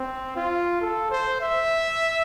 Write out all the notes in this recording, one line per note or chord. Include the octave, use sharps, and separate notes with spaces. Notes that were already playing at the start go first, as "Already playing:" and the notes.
Already playing: C4
F4
A4
C5
E5